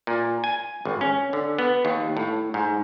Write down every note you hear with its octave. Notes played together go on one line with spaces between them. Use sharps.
A#2
G#5
G#1
C#4
D3
B3
D#2
A2
G#2